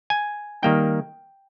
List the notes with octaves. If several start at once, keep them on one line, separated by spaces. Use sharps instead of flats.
G#5
D#3 G3 A#3 D#4 G5